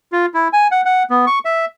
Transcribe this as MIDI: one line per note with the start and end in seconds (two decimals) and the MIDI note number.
0.12 0.26 65
0.34 0.48 64
0.53 0.68 80
0.71 0.81 78
0.85 1.03 78
1.10 1.25 59
1.27 1.39 85
1.45 1.65 76